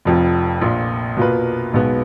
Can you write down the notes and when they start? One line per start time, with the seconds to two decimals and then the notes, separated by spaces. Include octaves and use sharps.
0.05 F1 F2 F3
0.61 A#1 A#2 F3
1.17 B2 A#3 F4 B4
1.74 B1 B2 G#3 B3